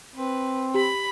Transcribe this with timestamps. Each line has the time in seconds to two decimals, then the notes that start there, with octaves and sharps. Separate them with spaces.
0.15 C4 B4
0.75 G4 B5